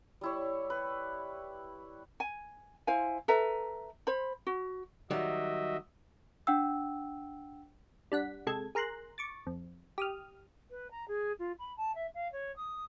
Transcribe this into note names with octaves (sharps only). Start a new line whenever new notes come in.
G3 E4 C#5
B4
G#5
E4 C5 F5 G#5
A4 B4 E5 A#5
C5 B5
F#4
D#3 F#3 G3 F#4 D#5 E5
D4 F#5 G5 E6
G3 D4 F#5 B6
C3 G#3 A4 G#6
G#4 A#4 A#5 C6 F#6
C#6 D6 A6
F2
G4 D#6 F6
B4
A#5
G#4
F4
B5
A5
E5
F5
C#5
D#6